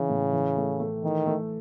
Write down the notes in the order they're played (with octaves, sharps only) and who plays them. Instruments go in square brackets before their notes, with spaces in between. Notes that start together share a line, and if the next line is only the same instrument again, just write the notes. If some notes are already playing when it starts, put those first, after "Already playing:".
Already playing: [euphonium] C#3 [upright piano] E3
[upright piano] A2
E3
A3
A3
[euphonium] D#3 [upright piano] E3
[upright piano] A3